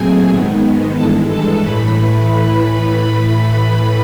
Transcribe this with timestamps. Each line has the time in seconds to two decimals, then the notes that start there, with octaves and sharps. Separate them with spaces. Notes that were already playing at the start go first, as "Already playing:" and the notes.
Already playing: A#2 F#3 A3 C4 G#4 G#5
0.28 G#2 D#3 G#3 B3
0.95 G2 E3 G#3 A4 A5
1.28 A4 A5
1.61 A2 E3 A3 B4 B5
1.94 B4 B5